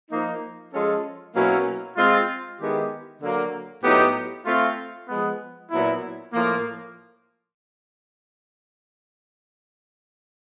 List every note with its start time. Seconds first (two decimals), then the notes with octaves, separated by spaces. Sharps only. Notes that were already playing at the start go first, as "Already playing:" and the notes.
0.10 F3 A#3 D#4
0.72 F3 G#3 C#4 F4 A4
1.34 B2 F#3 A#3 C#4 E4
1.97 G#3 C4 F4
2.59 D#3 G#3 B3 E4 G4
3.21 D3 F#3 A#3
3.83 A2 F#3 B3 D#4 G4
4.46 A3 C4 F4
5.08 F3 G#3 B3
5.70 A#2 F#3 B3 E4
6.33 A2 F3 A#3